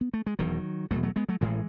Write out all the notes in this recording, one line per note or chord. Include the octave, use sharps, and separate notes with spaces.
B3
A3
G#3
E1 E2 B2 D#3 F#3
E1 E2 B2 F#3 A3
F#3 A3
G#3 B3
F#3 A3
A1 A2 E3 G#3